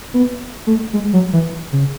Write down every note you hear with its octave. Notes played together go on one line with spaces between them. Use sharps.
B3
A3
G#3
F#3
E3
C#3